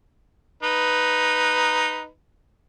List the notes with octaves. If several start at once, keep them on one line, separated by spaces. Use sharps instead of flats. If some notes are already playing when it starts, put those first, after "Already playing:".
D#4 B4